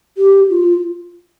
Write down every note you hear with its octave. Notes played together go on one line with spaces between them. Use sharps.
G4
F4